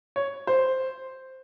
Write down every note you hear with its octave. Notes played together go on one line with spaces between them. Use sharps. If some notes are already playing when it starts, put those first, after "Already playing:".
C#5
C5